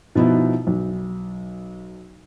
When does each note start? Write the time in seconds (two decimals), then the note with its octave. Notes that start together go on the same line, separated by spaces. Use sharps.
0.15 B2 F3 B3 D#4 E4
0.67 B1